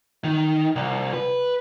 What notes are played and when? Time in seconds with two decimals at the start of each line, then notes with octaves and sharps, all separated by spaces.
0.24 D#3
0.76 C2
1.13 B4